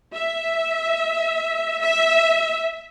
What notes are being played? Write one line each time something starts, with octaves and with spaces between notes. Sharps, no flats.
E5
E5